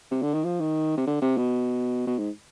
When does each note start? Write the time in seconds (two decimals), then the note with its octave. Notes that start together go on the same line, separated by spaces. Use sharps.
0.11 C3
0.22 D3
0.34 D#3
0.45 F3
0.60 D#3
0.97 C3
1.07 D3
1.22 C3
1.37 B2
2.07 B2
2.18 G#2